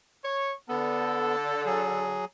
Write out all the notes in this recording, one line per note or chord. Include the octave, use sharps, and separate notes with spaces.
C#5
D3 B3 A4
F#3 G#4